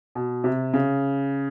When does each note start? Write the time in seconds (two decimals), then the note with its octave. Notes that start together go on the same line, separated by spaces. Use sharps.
0.15 B2
0.44 C3
0.74 C#3